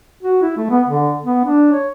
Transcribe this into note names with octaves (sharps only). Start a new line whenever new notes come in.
F#4
E4
A3
B3
D3
B3
D4
C#5